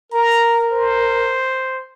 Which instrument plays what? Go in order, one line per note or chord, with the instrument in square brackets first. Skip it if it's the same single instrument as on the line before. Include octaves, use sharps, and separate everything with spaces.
[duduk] A#4 [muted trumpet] A#5
[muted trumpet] C5